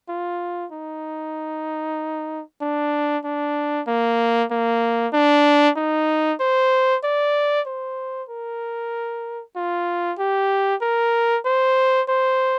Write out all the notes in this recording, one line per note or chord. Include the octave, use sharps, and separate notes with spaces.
F4
D#4
D4
D4
A#3
A#3
D4
D#4
C5
D5
C5
A#4
F4
G4
A#4
C5
C5